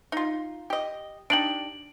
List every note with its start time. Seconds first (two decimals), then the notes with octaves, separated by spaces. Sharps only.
0.12 D#4 F4
0.70 G4 D#5
1.30 D4 D#4 G4 D7 F#7